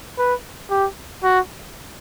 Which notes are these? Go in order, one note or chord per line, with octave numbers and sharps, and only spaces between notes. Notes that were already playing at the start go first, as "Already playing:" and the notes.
B4
G4
F#4